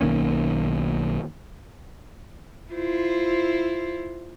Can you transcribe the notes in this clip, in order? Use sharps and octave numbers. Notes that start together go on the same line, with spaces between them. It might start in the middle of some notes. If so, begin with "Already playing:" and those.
B1 D#3 A#3 C#4
E4 F4 C5